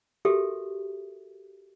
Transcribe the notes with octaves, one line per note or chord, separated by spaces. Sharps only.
F#4 G4 A4 A#4 E5